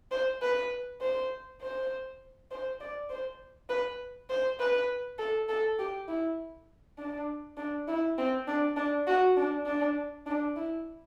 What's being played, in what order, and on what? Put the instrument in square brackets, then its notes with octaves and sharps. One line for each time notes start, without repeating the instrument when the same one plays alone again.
[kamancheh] C5
B4
C5
C5
C5
D5
C5
B4
C5
B4
A4
A4
G4
E4
D4
D4
E4
C4
D4
D4
F#4
D4
D4
D4
E4